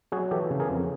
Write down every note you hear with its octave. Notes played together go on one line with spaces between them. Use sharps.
F#3 F#4 G#4
E3 G4 A4
C#3
G#4 A#4
F2